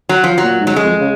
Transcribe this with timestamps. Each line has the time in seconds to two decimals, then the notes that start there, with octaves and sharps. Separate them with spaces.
0.09 F#3
0.24 F3
0.38 F#3
0.43 A#2
0.60 G#2
0.67 F#3
0.75 F#2 G#3
0.84 F2
1.01 C#3